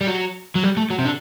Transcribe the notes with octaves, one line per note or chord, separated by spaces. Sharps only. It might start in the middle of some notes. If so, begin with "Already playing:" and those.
G3
F#3
F#3
G3
A3
F#3
C3
D3